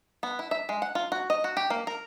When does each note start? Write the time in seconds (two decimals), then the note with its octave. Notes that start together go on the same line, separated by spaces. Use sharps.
0.23 B3
0.39 E4
0.51 E5
0.69 G#3
0.82 F#5
0.95 F4
1.12 F#4
1.30 D#5
1.44 F#4
1.57 G4
1.70 A#3
1.87 A#4